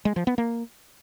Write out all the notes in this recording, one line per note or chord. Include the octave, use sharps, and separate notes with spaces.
G#3
F3
B3
A#3